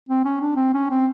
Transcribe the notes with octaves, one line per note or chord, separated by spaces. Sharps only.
C4
C#4
D4
C4
C#4
C4